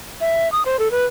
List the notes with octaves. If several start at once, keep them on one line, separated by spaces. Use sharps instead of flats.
E5
D#6
C5
A4
B4